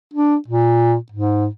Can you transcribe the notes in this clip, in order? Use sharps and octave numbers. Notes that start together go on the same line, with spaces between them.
D4
A#2
G#2